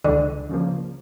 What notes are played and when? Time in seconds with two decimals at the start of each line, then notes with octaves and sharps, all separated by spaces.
0.04 C#2 D3
0.49 C#3 F3 A#3